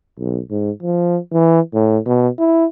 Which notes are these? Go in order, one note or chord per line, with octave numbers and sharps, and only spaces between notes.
B1
G#2
F3
E3
A2
B2
E4